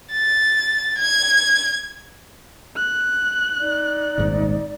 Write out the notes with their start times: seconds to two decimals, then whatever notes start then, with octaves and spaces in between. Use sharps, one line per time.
0.12 A6
0.98 G#6
2.77 F#6
3.59 D#4 D5
4.18 D#1 G#1 G#2